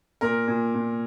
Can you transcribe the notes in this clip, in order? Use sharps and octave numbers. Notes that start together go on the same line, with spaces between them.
A#2 A#4
A#2
A#2